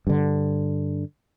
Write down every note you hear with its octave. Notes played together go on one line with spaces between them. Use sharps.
G2 D3